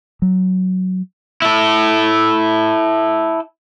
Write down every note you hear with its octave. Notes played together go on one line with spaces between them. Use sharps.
F#3
E4 A4